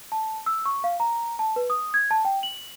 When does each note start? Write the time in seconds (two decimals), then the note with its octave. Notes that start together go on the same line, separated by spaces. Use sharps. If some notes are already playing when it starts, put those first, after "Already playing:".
0.12 A5
0.46 E6
0.66 C#6
0.84 F5
1.00 A#5
1.39 A5
1.56 B4
1.70 D#6
1.94 G#6
2.11 A5
2.25 G5
2.43 F#7